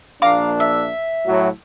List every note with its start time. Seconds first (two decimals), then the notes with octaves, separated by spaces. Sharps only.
0.22 A#1 A#3 D4 F5 A#5 D6
0.60 E5
1.26 A2 F#3